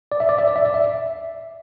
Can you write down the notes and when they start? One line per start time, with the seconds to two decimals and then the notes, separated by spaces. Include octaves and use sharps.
0.12 D5
0.20 E5
0.29 D5
0.39 E5
0.48 D5
0.56 E5
0.65 D5
0.74 E5